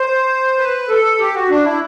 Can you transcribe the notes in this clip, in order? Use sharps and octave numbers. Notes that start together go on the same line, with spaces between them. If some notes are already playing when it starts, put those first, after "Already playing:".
Already playing: C5
B4
A4
G4
F#4
D4
E4